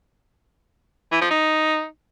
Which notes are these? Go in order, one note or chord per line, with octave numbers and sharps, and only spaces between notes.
E3
F3
D#4